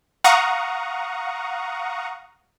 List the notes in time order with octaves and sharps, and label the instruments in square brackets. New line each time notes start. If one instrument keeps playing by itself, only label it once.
[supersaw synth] F5 F#5 A#5 C#6 D#6